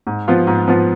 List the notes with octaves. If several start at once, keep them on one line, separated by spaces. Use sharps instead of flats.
G#2
F3 B3 F4
G#2
F3 B3 F4